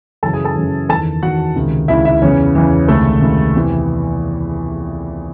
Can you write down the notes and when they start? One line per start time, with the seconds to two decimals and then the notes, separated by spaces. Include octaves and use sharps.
0.23 F#2 C#3 E3 A4 A5
0.33 G#4 G#5
0.44 A4 A5
0.56 F#2 C#3 E3
0.89 E2 A4 A5
0.93 D#3
1.22 E2 D#3 F#4 F#5
1.56 C#2 C3 D#3
1.88 C#2 C3 D#3 E4 E5
2.05 E4 E5
2.22 E2 C#3 E3 C#4 C#5
2.55 E2 C#3 E3
2.88 C#2 C3 D#3 A3 A4
3.22 C#2 C3 D#3
3.55 E2 C3 E3